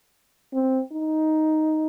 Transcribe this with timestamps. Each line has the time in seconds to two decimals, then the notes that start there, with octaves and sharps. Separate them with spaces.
0.54 C4
0.92 D#4